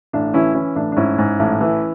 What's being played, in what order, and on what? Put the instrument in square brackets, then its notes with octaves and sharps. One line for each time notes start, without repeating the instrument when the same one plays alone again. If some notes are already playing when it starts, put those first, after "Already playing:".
[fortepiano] A1 D4
E3 C#4 E4
E3 C#4 E4
A1 D4
D4
G#2 C#4 E4
G#2
A1
E3